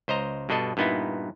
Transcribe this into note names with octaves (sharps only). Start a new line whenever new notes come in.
C#2 C5 D#5 A#5
G2 B2 D4 A4 D#5
G2 A#2 B3 D#4 E4